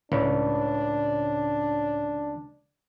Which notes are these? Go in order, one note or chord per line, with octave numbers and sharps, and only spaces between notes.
C#2 A2 D4 C#5 D5